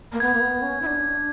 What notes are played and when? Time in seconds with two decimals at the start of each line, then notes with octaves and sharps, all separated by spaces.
0.12 A#3
0.20 B3 G#6
0.34 A#3
0.41 B3
0.62 C#4
0.82 E4
0.86 D4